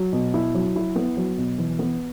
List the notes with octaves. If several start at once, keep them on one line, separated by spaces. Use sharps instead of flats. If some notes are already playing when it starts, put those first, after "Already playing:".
Already playing: F#3
B2
E4
F#3
E4
B3
F#3
B2
E3
B3